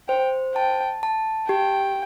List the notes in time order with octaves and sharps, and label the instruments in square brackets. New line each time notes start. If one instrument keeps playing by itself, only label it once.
[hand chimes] C5 [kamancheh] G5
[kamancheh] G5 [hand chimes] A5
[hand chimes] A5
[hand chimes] G4 [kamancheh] G5